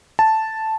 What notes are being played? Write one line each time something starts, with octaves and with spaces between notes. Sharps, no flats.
A5